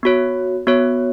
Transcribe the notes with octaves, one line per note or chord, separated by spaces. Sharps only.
B3 F#4 C#5
B3 F#4 C#5